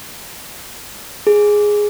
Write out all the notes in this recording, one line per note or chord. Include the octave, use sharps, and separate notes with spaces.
G#4